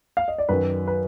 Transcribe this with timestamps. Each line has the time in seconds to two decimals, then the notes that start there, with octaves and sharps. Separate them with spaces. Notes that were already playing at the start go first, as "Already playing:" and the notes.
0.17 F5
0.28 D#5
0.38 D5
0.49 F#2 D#3 F#3 B4
0.87 B4